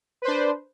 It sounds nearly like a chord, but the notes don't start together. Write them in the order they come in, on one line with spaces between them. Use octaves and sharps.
B4 C5 D4